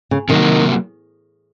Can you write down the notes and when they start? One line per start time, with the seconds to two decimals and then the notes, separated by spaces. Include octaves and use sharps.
0.11 C#3
0.29 C3 D#3 F#3 A#3